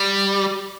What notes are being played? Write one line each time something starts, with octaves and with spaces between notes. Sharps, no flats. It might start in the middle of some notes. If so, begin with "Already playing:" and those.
Already playing: G3